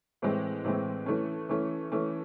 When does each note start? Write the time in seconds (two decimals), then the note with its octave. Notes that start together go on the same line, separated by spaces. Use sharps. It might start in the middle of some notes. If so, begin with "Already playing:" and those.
0.22 A2 E3 G#3 C4
0.64 A2 E3 G#3 C4
1.06 E3 A3 C#4
1.49 E3 A3 C#4
1.92 E3 A3 C#4